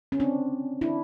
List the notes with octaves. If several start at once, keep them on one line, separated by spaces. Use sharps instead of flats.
C#4
C4 D4
D4 E4